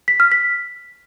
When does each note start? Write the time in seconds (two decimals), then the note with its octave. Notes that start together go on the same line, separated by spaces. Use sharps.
0.08 B6
0.20 F6
0.32 B6